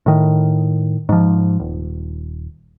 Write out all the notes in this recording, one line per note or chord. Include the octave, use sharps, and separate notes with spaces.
A2 D#3
G#2 F3
D#1